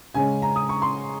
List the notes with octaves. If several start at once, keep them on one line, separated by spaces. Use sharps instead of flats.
C#3 G#3 C#4 G#5
A#5
D#6
C#6
C6